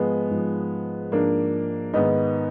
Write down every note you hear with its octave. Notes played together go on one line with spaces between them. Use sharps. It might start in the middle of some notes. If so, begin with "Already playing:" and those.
Already playing: G#2 F3 G#3 B3
G#2 F3
G#2 F3 A#3 D4
G#2 D#3 B3 D#4